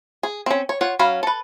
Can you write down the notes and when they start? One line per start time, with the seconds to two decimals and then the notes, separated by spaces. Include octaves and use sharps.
0.23 G#4
0.46 C4 C#4
0.69 C#5
0.81 F4 C#5 F#5
0.99 F#3 C#4 F#4 F5 B5
1.23 A4 B4